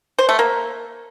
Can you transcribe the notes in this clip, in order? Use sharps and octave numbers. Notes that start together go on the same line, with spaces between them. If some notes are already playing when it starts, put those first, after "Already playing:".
C5
A3
A#3